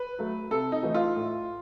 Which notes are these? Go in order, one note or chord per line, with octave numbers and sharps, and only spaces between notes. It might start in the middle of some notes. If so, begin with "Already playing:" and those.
Already playing: B4
F#3 A3
C3 A4
D#4
E3 A3
F4
A2